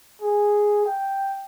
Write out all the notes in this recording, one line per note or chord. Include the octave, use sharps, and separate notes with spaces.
G#4
G5